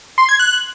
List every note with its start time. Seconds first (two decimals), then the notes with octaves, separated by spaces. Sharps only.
0.18 C6
0.29 G#6
0.39 F#6